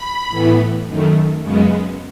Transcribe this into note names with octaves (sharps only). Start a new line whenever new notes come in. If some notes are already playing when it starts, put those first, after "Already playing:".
Already playing: B5
A2 E3 B3
F#2 D#3 A3
F#2 C#3 G#3 B3